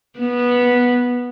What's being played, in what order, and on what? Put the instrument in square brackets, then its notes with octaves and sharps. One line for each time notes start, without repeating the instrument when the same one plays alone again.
[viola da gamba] B3